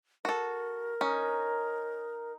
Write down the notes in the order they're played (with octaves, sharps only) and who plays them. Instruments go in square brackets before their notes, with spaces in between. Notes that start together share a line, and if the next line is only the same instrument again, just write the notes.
[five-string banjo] F#4 A4 [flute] A#4
[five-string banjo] C#4 [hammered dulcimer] D#4